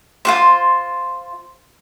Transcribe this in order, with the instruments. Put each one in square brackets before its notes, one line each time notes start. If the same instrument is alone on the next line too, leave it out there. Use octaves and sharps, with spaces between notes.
[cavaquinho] F4 F#4 C5